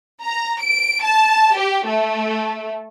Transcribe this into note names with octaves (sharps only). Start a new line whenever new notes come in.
A#5
D7
A5
G4
A3